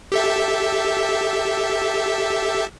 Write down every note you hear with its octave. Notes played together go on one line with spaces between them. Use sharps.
G4 A4 E5